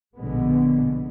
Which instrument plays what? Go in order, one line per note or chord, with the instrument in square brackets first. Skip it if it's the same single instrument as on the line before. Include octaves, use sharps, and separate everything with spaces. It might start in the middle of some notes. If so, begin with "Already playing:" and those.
[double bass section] A#1 B2 D3 G#3 B3